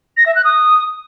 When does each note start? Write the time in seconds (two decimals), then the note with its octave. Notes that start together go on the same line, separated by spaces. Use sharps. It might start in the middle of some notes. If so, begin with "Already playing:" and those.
0.17 A#6
0.26 E5
0.35 F#6
0.45 D#6